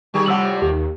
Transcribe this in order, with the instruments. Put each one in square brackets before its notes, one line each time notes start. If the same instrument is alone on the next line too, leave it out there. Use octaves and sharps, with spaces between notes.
[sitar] D#3 G4 G#4 [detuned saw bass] G3
[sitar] A2 C3 F3 [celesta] F#5 E6 F#7
[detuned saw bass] D#2 [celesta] G4